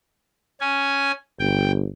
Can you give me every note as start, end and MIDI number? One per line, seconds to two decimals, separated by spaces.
0.61 1.12 61
0.61 1.12 80
1.40 1.88 31
1.40 1.72 79